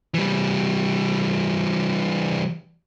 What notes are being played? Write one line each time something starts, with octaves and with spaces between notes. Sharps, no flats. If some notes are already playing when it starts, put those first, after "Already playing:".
E3 G3